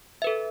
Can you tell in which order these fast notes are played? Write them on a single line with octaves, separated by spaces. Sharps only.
E5 B4 A4